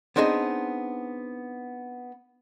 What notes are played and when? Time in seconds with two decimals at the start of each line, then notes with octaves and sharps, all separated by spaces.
0.16 B3 C4 D4 D#4 G#4